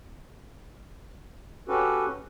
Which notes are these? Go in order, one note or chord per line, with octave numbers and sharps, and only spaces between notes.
C#4 F#4 G4 A4 B4